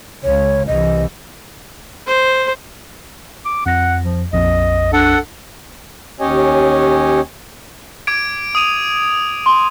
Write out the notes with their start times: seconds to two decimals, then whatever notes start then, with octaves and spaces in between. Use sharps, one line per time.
0.23 C#2 C#3 C#5
0.67 C2 E3 D#5
2.07 C5
3.45 D6
3.66 F2 F#5 A#6
4.04 F3
4.33 A#1 F2 D#5
4.93 D4 A4 F#5
6.20 D#2 C#4 G4 C#5 D#5 G#5
8.07 D6 G#6 D7
8.55 D#6 D#7 F7
9.46 C6